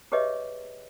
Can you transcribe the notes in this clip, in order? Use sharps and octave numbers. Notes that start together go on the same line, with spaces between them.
G4 G#4 B4 C#5 D#5 E5